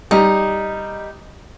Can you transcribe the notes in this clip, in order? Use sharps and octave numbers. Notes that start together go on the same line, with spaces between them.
G3 D#4